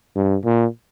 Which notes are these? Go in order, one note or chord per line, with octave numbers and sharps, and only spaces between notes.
G2
A#2